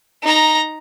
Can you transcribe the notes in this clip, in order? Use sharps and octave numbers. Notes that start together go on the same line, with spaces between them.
D#4 A#5